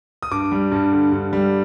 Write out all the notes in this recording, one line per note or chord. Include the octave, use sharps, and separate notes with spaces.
D#6
G2 D6
G3
G2
D3
G2
G3